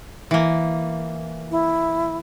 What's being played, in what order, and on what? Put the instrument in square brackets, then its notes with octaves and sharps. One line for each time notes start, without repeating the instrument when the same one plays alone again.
[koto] E3 A#3
[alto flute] E4